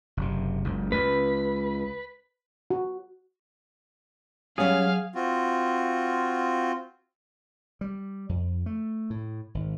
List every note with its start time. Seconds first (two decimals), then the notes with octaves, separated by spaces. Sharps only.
0.17 F#1 C3
0.64 F#1 C#2
0.92 C#2 B4
2.70 F#4
4.58 F#3 G3 C#4 G#4 F5
5.15 C4 F4 F#4
7.81 G3
8.29 F2
8.66 A3
9.10 A2
9.54 G#1